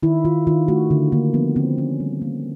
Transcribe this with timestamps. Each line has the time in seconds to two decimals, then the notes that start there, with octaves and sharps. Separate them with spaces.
0.03 D#3 E4
0.25 D#3 F4
0.47 D#3 F4
0.68 A3 F#4
0.91 D3
1.12 D3 A#3
1.34 F3 B3
1.56 D3 C4
1.78 A#3 C#4
2.00 G3
2.22 A#3